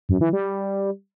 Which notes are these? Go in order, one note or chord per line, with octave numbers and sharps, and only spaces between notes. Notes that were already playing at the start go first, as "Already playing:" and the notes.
F#2
E3
G3